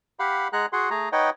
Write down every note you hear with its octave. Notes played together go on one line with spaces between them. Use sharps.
G4 F5 F#5 B5
G#3 G#4 F#5 A#5 F#6
F#4 G#4 F#5 C6
A3 G#4 A#5
D#4 B4 C#5 D#5 F#5 G5